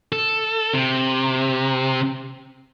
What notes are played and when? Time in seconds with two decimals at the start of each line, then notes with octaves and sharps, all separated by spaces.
0.12 A4
0.74 C3